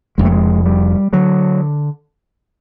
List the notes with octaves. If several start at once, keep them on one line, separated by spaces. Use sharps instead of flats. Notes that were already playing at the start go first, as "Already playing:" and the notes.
F1 F2 C#3 G#3
A3
G#3
G3
D3 F#3